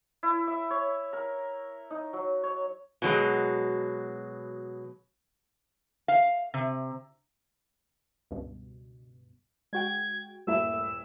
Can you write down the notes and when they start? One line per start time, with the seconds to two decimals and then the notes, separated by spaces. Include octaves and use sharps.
0.23 E4
0.47 E5
0.71 C#5
1.13 A#4
1.91 D#4
2.13 F#3
2.44 C#5
3.02 B2 F#3 G#3
6.08 F5
6.54 C3
8.31 C#2 G2 B2
9.73 G#3 F#4 G5 G#6
10.47 D#1 G2 A3 A#3 E4 E5 E6